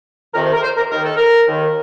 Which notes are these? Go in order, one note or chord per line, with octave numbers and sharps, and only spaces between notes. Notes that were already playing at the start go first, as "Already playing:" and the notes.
F2 C3 D#3 A#4
C5
A#4
C5
A#4
D#2 D#3 A#4
A4
A#4
D#2 D#3